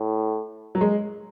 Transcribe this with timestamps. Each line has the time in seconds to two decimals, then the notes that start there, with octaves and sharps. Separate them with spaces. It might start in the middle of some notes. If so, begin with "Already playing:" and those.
Already playing: A2
0.75 F#3
0.81 G#3